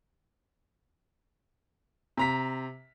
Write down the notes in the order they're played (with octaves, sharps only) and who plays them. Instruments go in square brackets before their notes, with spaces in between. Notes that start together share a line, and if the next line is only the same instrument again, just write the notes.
[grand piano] C3 A#5 B6